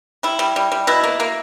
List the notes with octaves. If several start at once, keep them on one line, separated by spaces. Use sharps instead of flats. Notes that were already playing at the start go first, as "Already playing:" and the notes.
G3 E4
G3
G3
G3
B2 E4
A#3
A#3